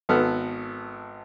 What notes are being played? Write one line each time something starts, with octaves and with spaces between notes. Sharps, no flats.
G#1 B3 A4 F6